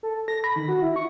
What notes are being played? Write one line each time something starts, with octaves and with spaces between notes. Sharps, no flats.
A4
A#6
B5
D#3
F#4
E4
C#6